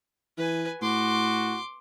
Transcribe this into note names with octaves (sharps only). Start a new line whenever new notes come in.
E3 B4 G#5
A2 F#4 C6 D6